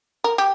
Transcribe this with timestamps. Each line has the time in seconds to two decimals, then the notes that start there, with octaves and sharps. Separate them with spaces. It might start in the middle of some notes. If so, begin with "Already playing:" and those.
0.24 A#4
0.38 G4